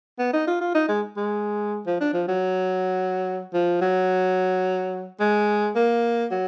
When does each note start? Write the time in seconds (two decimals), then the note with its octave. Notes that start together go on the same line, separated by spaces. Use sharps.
0.19 B3
0.33 D#4
0.48 F4
0.61 F4
0.75 D#4
0.89 G#3
1.17 G#3
1.87 F3
2.01 D4
2.14 F3
2.29 F#3
3.54 F3
3.82 F#3
5.21 G#3
5.76 A#3
6.32 F#3